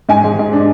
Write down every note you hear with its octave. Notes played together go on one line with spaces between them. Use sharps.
G#2 G#5
G#3
G#2
D4